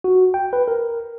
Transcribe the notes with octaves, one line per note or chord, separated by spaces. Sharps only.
F#4
G5
B4
A#4